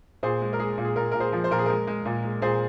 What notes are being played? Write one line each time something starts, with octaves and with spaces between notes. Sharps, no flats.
A#2 G#4 C5
G#3
A#4
G#3 G#4
A#2
G#4
A#2 A#4
A#2 A#4
G#4 C5
F3
C5
A#2 A#4
G#4
G#3 A#4
G#3
A#2
G#3
A#2 G#4 C5